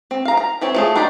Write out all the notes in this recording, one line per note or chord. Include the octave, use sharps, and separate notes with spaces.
C4
F5 A#5
A#5
E3 C4 C#5
F3 A3 G#4
D#3 D4 C5 D5 B5